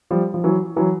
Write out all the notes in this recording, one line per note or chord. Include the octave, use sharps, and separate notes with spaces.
F3 G3
F3
E3 F#3
E3 F#3